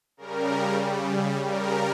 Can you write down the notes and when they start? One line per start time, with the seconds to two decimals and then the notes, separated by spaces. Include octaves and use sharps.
0.17 C#3 G3 A#4
1.41 C#3 G3 A#4